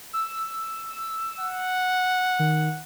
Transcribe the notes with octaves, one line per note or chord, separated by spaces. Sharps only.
E6
F#5
D#3